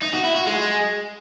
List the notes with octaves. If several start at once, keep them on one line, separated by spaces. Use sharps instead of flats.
D#4
F#4
E4
F#4
G#3